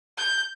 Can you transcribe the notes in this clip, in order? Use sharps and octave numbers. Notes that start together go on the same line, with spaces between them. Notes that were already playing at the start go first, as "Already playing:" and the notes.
G6